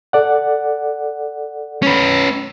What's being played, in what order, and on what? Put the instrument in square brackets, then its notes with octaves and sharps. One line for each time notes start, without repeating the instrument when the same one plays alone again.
[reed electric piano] A4 D5 F#5
[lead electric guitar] C#4 B4